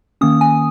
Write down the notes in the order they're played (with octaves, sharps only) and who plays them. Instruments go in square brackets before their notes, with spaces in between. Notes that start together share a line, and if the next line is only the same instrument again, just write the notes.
[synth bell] D#3 A#3 C#4 D#6
G#5